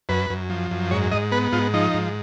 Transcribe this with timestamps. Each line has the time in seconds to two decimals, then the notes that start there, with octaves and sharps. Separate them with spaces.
0.09 F#2 B4
0.30 F#2
0.50 F3
0.71 F#2
0.91 G#2 C#5
1.11 G#2 D#5
1.32 B3 B4
1.52 G#2 F4
1.73 F3 D#4
1.94 G#2